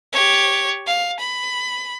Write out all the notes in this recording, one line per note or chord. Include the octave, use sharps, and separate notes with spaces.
G4 C#5
F5
B5